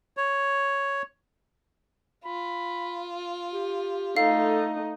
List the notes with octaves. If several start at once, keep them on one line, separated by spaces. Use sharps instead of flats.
C#5
F4 B5
G4
A3 D#4 A4 F5